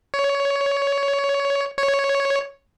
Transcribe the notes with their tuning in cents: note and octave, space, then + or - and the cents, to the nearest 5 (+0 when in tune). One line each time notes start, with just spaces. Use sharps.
C#5 +15
C#5 +0